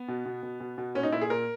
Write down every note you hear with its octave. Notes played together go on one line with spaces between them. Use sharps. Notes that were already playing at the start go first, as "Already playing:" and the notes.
Already playing: B3
B2
B2
B2
B2
B2
A#2 C#4
D#4
A#2 E4
G#4
A#2 A#4